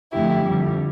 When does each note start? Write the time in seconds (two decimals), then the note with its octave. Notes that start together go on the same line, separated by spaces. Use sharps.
0.12 F2 D3 A3 E4 G4
0.44 F2 D3 G3